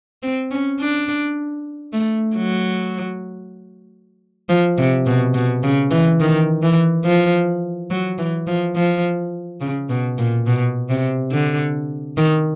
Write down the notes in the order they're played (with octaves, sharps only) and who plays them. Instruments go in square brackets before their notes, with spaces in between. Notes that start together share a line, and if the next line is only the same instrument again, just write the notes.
[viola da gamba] C4
C#4
D4
A3
F#3
F3
C3
B2
B2
C#3
E3
D#3
E3
F3
F#3
E3
F3
F3
C#3
B2
A#2
B2
C3
D3
D#3